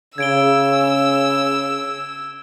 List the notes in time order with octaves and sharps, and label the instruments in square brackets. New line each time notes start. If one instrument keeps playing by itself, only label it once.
[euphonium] C#3 [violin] E6 [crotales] G#6 D7 G7